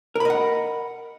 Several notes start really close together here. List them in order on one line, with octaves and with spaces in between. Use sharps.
A#4 B5 D#5 F#5